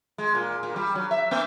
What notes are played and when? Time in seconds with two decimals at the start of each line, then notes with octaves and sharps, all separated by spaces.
0.18 G#3
0.35 A#2
0.63 A#2
0.76 G3
0.95 F#3
1.11 E5
1.31 A#3